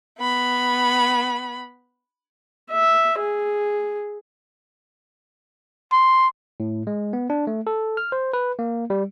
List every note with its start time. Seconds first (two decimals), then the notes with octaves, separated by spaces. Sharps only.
0.19 B3 B5
2.70 E5
3.19 G#4
5.93 C6
6.60 A2
6.87 G#3
7.13 B3
7.30 D4
7.47 A3
7.67 A4
7.97 F6
8.12 C5
8.33 B4
8.59 A#3
8.90 G3